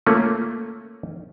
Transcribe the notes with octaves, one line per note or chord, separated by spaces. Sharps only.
A3 A#3 C#4 F4